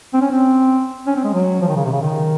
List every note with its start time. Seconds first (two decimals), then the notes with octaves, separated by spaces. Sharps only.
0.13 C4
0.21 C#4
0.30 C4
1.07 C#4
1.16 C4
1.24 G#3
1.33 F#3
1.61 F3
1.67 D#3
1.76 C#3
1.85 C3
1.92 C#3
2.01 D#3